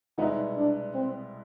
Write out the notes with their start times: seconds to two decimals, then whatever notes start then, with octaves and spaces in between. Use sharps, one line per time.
0.18 C2 B2 G#3 B3 D#4 E4
0.57 D4
0.94 C4